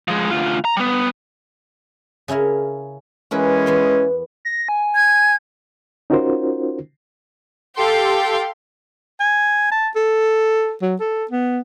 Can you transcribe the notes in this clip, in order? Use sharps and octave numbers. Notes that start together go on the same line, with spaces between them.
F3 G#3
D2 F4
A#5
G3 B3
C#3 C#4 E4 A#4
E3 G#3 C#4 F#4 A#4 B4
E2 B3 C6
A#6
G#5
G#6
C#4 D#4 F4 F#4 A#4 C5
G4 A4 F5 G5 C6
G#5
A5
A4
F#3
A4
B3